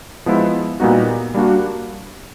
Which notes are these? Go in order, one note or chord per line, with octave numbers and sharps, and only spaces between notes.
F3 G#3 B3 E4
A#2 G3 B3 D#4 F#4
G3 A#3 D4 F#4